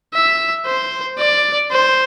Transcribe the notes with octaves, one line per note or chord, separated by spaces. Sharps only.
E5
C5
D5
C5